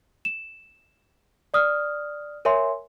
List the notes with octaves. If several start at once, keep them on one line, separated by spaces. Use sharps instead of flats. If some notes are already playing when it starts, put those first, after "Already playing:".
E7
D5 D#6 F6
A#4 C#5 E5 G#5 C6